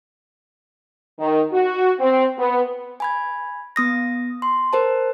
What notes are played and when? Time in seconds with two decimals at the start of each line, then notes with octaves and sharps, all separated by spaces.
1.19 D#3
1.53 F#4
2.00 C4
2.39 B3
3.00 G#5 B5 G#6
3.76 B3 D#6 A#6
4.42 C6
4.73 A#4 C5 A5